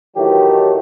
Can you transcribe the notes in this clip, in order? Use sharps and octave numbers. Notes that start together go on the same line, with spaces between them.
A2 D#3 E3 F#3 A3 G4